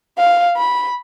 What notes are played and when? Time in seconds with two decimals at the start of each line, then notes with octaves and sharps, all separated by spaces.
0.18 F5
0.57 B5